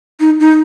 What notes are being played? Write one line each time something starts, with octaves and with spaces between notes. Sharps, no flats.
D#4
D#4